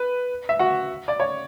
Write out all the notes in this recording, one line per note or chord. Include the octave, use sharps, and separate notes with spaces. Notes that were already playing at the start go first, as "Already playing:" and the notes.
Already playing: B4
E5
F#4 F#5
D5
C#5